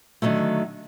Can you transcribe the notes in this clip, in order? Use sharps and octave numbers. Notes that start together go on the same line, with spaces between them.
D3 D#3 F3 F#3 A3